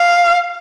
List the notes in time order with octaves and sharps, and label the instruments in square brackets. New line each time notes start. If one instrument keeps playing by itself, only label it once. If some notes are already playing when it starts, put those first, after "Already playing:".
Already playing: [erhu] F5